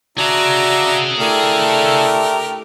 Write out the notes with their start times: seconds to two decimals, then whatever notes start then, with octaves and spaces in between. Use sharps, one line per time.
0.18 D4 F#4 G#4 E5 F5 A#5
1.19 A3 D4 E4 G4 A4 A#4